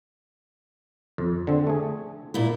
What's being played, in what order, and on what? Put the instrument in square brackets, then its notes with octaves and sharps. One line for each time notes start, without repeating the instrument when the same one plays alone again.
[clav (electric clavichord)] F2
D3 C4
A3 G#4
[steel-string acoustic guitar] A#2 E4